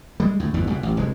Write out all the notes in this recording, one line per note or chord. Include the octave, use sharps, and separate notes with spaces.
G3 G#3
D2 A2
G1 E2 G2 B2
C#2 B2
A1
F1 D2 G#3